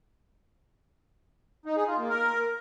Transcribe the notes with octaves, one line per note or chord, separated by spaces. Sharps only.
D#4
G#4
F4
A#3
A#4